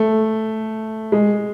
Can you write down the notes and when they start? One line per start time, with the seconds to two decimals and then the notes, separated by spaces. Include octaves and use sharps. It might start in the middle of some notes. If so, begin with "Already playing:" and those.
Already playing: A3
1.12 G#3